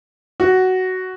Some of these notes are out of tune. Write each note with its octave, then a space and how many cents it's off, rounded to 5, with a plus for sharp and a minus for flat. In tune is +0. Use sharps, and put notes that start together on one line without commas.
F#4 +10